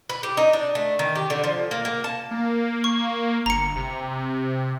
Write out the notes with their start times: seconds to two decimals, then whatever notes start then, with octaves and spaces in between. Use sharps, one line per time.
0.09 B4
0.23 G4
0.37 D#4
0.53 D4
0.75 A3
0.99 D#3
1.16 G4
1.30 D3
1.44 F3
1.71 A#3
1.85 A#3
2.04 A5
2.31 A#3
2.84 C#6
3.46 G1 A#5 C#7
3.76 C3